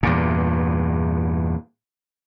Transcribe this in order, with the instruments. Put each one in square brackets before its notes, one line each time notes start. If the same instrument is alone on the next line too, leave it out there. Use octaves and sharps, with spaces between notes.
[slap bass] E2 G2 A#2